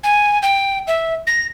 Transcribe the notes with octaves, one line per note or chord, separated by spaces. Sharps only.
G#5
G5
E5
A#6